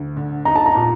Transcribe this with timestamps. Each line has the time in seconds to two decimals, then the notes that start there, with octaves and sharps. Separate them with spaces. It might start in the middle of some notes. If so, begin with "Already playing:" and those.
Already playing: D2
0.17 D3
0.45 D#4 A#5
0.56 A5
0.66 A#5
0.75 A#2